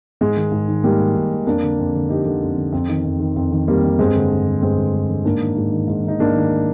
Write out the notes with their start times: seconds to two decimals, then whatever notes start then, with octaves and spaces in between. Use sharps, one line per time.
0.21 G#2 G#3
0.36 D#3
0.52 G#2
0.68 D#3
0.84 G#2 G3 A#3
1.00 D#3
1.15 G#2
1.31 D#3
1.46 F2 A#3 D4
1.63 D3
1.79 F2
1.95 D3
2.09 F2 D#4 G4
2.26 D3
2.42 F2
2.57 D3
2.72 F2
2.89 D#3
3.05 F2
3.20 D#3
3.36 F2
3.52 D#3
3.68 F2 G3 A#3
3.84 D#3
3.99 G2 G#3 C4
4.15 D3
4.31 G2
4.46 D3
4.62 G2 G#3 C4
4.77 D3
4.94 G2
5.09 D3
5.24 G#2 A#3 D4
5.40 D#3
5.56 G#2
5.72 D#3
5.88 G#2
6.04 D#3 D#4
6.20 G#2 A#3 D4
6.35 D#3